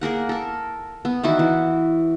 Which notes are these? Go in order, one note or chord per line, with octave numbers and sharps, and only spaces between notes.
A#3 G#4 A#4 F#5
A4 A#4
B3
D#3 E3 E4 F#4
E3